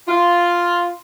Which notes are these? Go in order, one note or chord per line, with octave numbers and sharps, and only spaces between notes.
F4